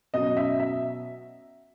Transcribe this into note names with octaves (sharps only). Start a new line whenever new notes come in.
B2 F#3 C#4 D#5
E5
E5